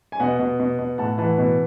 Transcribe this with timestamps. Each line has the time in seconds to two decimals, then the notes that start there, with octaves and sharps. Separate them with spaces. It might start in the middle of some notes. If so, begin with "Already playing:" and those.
0.12 G#5
0.20 B2 D#5 F#5
0.39 B2
0.60 B2
0.79 B2
0.98 A2 F#5 A5
1.18 E3 F#5 A5
1.38 B2